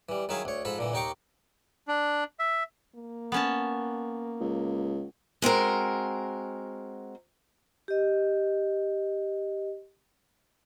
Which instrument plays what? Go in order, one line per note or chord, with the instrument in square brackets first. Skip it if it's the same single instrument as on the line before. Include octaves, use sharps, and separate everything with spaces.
[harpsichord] E3 G3
D#3 F#3 E4 G#4 E5 F5
D2 C#5
G#2 F3 A4 B5
A#2 D3 E3
D#2 D#4 G5 A#5 C#6 D6
[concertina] D4
E5
[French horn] A#3
[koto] B3 C#4 A5
[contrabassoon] C#2
[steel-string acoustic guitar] G#3 C4 F#4 A#4
[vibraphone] G4 D#5